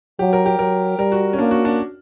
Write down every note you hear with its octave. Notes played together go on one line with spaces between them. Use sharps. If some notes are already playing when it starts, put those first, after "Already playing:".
F#3 G4
A#4
G4
F#3 A#4
G3 A#4
F#4
C#4
A#3 D4
F#4
D4